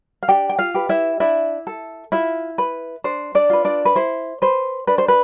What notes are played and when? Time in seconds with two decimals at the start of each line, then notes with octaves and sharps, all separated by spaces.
0.23 F5
0.28 D4 G4 G5
0.49 G5
0.59 F4 F5
0.74 G4 B4
0.89 E4 E5
1.20 D4 E4 E5
1.67 A4
2.12 E4 F4 E5
2.58 B4
3.04 D4 C5
3.35 D4 D5
3.50 F4 B4
3.65 D4 D5
3.85 B4
3.95 E4 C5
4.42 B4 C5
4.87 D4 B4
4.98 C5
5.08 B4